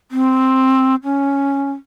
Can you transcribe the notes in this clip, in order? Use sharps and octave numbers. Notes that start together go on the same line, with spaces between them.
C4
C#4